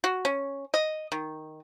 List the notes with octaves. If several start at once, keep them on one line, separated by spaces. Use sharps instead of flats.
F#4
C#4
D#5
D#3